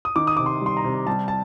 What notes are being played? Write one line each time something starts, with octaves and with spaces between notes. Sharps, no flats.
D#6
D#3 D6
D#6
C3 D6
C6
G3 C6
A#5
C3
G3 A5
A5